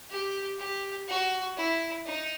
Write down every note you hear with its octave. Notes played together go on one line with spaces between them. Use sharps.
G4
G4
F#4
E4
D#4